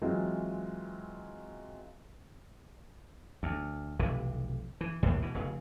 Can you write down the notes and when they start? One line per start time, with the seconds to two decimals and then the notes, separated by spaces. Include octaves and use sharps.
0.02 E3 F#3 G#3 C4 F4
3.43 D2
3.99 F1 B1 C3 E3
4.81 E3
5.03 A#1 D#2 A2 G3
5.22 B2 E3
5.34 F1 C#3